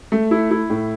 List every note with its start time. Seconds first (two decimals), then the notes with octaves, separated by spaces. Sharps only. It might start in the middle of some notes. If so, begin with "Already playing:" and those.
0.12 A3
0.31 E4
0.51 E4
0.70 A2